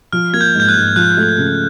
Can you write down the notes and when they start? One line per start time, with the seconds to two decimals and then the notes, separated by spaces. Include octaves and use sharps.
0.12 F3 F6
0.33 A#3 G#6
0.41 G6
0.55 G#2 G6
0.69 F#6
0.76 G#2
0.96 F3 F#6
1.17 A3
1.38 C#3